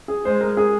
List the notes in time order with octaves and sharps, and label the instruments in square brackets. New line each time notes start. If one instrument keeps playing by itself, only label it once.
[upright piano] G#4
[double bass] G#3 [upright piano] C5
[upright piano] A#4
G#4